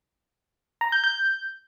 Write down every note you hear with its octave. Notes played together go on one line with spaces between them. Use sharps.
A#5
G6
G6